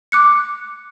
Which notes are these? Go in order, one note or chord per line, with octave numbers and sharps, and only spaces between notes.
D6 F#6 C#7